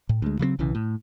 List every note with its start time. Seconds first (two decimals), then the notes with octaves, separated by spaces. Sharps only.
0.09 A2
0.22 D2 G#3
0.39 C#3 F#3 G3 C4
0.59 B1 C#3 E3
0.75 A2